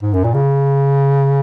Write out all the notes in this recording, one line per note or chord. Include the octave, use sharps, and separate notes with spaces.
G#2
F#2
A#2
C#3